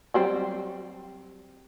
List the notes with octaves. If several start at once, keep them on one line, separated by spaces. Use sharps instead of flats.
F#3 G3 C4